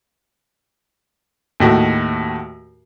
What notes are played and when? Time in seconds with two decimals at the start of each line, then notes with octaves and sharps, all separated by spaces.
1.60 D#2 A2 F#4